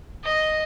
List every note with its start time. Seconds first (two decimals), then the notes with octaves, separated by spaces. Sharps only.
0.24 D#5